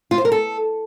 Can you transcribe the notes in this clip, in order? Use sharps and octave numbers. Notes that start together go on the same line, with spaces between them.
F4
C5
A#4
A4